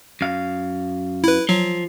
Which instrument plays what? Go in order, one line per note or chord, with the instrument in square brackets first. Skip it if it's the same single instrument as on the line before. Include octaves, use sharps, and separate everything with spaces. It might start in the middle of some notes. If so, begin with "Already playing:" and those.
[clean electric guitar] F#2 F5
[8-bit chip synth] E4 B4
[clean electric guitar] F3 [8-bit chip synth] F#3